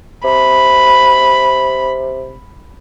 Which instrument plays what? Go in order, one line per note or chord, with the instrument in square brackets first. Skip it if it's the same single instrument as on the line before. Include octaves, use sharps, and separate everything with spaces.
[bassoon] C3 [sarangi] B5